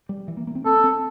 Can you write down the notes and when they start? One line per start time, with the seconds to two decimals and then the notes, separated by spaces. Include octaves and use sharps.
0.09 G3
0.28 E3
0.37 A#3
0.47 A#3
0.55 C4
0.66 C4 A4
0.84 C4